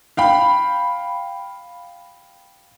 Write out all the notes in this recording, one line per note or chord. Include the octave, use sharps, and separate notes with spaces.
F5 G5 B5